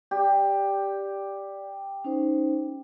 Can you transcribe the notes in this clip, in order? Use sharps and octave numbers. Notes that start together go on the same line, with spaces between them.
G4 D5
C#4 D#4 C5